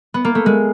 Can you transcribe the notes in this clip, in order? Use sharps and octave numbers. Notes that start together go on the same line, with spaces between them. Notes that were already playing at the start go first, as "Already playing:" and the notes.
B3
A#3
A3
G#3